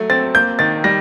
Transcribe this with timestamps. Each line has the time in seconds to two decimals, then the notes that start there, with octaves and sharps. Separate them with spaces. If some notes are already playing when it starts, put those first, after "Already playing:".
Already playing: F#3 A3
0.10 C4 A6
0.35 A#3 G6
0.59 D#3 A6
0.84 G3 A#6